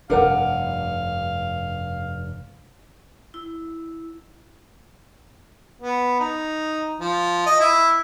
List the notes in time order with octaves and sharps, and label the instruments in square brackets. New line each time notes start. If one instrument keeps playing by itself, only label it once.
[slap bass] F1 G2 C3 [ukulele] D4 A#4 F#5 [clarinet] F5
[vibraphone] E4
[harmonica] B3
D#4
F3
D#5
E4